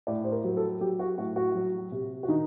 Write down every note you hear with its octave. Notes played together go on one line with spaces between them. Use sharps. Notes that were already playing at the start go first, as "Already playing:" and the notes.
A2 D5
C5
A#4
F#3
A4
F#3 G4
F#4
A2 F#4
F#4
F#3
C3
F#4
D#3 D#4